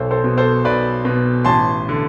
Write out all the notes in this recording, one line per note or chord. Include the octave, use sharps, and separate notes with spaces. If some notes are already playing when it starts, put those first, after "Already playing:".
Already playing: B1 A4 C5
A4 C5
B2
A4 C5
B1 B4 D5
B2
A1 A5 C6
D3